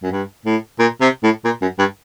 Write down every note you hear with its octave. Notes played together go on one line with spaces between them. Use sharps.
F#2
G2
A2
A#2
C3
A2
A#2
F#2
G2